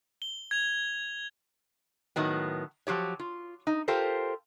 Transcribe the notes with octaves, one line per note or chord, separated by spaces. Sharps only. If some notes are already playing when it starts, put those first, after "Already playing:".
G7
G#6 F7
A2 D#3 F#3 B3
F3 F#3 G4 C#5
F4
D#4
F4 G4 A4 A#4 C5